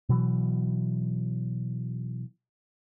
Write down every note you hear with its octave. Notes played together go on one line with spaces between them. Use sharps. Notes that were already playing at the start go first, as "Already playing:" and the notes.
B2 E3 F#3